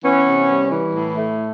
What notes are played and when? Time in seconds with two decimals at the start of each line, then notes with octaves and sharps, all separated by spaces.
0.03 E3 B3 C#4
0.26 C3
0.49 G3
0.71 E3
0.93 A2
1.17 A3